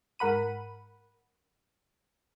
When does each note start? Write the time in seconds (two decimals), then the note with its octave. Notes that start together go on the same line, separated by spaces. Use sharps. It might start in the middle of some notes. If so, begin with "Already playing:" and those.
0.19 G#2 A#4 F#5 B5 D#7